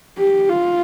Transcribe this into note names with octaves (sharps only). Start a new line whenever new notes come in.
G4
F4